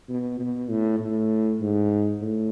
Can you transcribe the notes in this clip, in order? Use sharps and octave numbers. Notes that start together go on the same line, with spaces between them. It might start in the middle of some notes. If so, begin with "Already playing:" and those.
B2
B2
A2
A2
G#2
A2